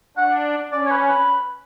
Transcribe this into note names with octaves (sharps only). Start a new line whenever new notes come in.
D4 F#5
C#4 D5
C#5
B4
B4